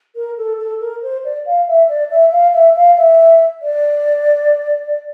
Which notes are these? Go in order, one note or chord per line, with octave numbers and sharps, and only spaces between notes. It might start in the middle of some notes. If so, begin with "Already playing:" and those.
A#4
A4
A4
A#4
C5
D5
F5
E5
D5
E5
F5
E5
F5
E5
D5